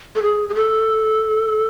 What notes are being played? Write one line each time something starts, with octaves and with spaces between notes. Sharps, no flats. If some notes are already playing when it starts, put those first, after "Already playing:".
A4
G#4
G#4
A4